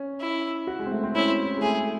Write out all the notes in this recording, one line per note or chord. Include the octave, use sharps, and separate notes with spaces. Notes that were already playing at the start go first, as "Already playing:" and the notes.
Already playing: C#4
E4
F#4
G#3
C4
A3
C4
C#4 E4
G#3
A3 G#4